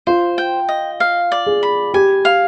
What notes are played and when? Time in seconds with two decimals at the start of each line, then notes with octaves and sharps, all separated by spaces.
0.07 F4 C5
0.38 G5
0.69 D#5
1.00 F5
1.32 D5
1.46 G#4
1.63 B5
1.94 G4 G#5
2.25 F5